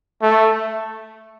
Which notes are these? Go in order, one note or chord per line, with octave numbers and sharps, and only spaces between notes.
A3